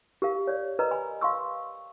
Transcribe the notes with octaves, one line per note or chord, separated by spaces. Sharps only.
G4 A#4 F5
C#5 D5
A#4 B4 D#5 A#5
G#5 B5
F5 C6 C#6 E6